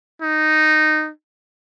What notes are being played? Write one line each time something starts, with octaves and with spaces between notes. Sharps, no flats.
D#4